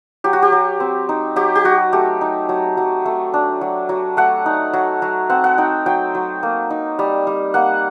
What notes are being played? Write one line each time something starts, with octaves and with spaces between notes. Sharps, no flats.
F#3 G4
F#4
G4
F#3
C4
D#4
F#3 G4
G4
F#3 F#4
A3 G4
D#4
F#3
F#3
A3
D4
F#3
F#3
A3 F#5
D#4
F#3
F#3
C4 F#5
F#5
D#4 G5
F#3 G5
F#3
A#3
D#4
G3
G3
A#3 F#5